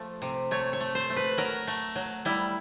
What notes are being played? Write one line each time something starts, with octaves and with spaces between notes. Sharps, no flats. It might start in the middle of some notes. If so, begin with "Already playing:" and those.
Already playing: F3 A3
C3
A3 C#5
C#5
A3
C5
A3
B4
F#3 A#4
A3
F#3
G3 E4